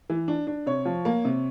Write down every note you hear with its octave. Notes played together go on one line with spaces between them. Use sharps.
E3
D4
D4
C3 C#5
F3
A#3
C3